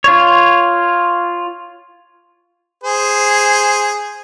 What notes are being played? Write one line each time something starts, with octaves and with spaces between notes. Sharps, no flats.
F4 C#5
G#4 C5